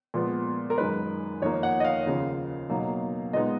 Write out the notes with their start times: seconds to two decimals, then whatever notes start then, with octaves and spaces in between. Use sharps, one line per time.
0.14 A#2 F3 G#3 B3
0.70 A#4
0.78 F#2 D#3 G#3 B4
1.41 F2 D#3 A#3 C#5
1.63 F#5
1.80 D#5
1.85 F5
2.06 D#2 C#3 F3 A#3
2.69 B2 F#3 A#3 D#4
3.33 A#2 G#3 B3 D#4 D#5